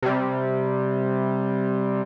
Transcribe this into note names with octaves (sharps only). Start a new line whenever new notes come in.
C3 G3